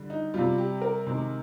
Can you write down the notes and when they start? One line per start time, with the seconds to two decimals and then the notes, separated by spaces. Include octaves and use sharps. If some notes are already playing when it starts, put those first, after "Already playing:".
Already playing: D3 G3
0.10 D#4
0.34 C3 G3 F4
0.58 G4
0.82 A#4
1.06 C3 D#3 G#3